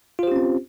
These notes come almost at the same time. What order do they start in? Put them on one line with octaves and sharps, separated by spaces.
F4 C5 G4 C#4 C4